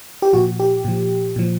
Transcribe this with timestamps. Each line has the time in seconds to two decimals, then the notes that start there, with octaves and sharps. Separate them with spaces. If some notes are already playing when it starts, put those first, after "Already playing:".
0.22 G4
0.33 A#2 F3 F#4
0.60 G4
0.85 A#2 F3
1.36 A#2 F3